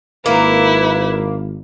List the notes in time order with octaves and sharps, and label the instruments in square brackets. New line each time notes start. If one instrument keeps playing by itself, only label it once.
[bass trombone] G#1 [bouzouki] A#3 [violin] E4 [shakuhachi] B4